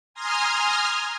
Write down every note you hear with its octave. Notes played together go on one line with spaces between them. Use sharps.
G#5 A#5 C6 D#6 F6